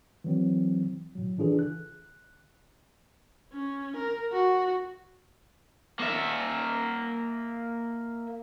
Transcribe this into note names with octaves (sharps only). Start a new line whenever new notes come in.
E3 F#3 C4
A2 F#3
E3 D4 F4 G#4 A4 B4
F#6
C#4
A#4
F#4
A#3 E5